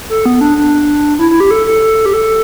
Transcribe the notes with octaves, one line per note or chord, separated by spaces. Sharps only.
A4
B3
D4
D4
E4
E4
G4
A4
A4
G4
A4